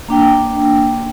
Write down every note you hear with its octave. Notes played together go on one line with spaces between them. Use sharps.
A#3 D4 G5